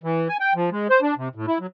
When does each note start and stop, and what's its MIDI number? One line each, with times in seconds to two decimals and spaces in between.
0.03 0.28 52
0.29 0.37 80
0.40 0.54 79
0.55 0.70 53
0.71 0.88 56
0.90 1.00 72
1.02 1.14 62
1.17 1.28 48
1.35 1.46 45
1.47 1.58 64
1.60 1.67 54